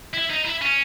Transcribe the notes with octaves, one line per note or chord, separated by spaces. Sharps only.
E4
D#4
E4
C#4